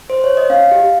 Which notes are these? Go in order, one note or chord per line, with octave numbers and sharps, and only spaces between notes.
C5
C#5
D#5
C#4 F5
G4